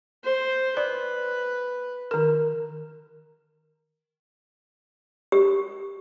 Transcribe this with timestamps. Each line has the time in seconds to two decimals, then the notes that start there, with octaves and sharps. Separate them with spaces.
0.25 C5
0.77 B4 D5
2.11 D#3 A#4
5.32 G4